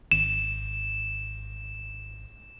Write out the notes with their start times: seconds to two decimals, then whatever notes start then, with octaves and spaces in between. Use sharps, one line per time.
0.12 G#1 E7